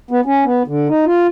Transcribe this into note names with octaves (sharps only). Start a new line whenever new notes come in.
B3
C#4
B3
D3
D#4
F4